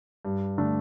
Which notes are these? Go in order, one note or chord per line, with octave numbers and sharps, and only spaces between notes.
G2
D3 A3 D4